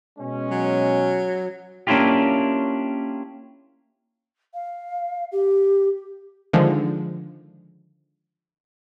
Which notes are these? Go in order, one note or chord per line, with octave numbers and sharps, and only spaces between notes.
B2 G#3 C#4
F#3
A#3 C#4 D4 E4 F4 G4
F5
G4
D3 D#3 F3 G#3